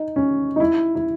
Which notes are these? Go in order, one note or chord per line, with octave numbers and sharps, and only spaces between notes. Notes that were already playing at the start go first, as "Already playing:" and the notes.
Already playing: D#4
C#4
D#4
E4
E4